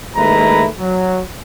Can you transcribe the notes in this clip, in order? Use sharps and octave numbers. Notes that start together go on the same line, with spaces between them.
D#2 G#3 A3 E4 B4 A#5
F#3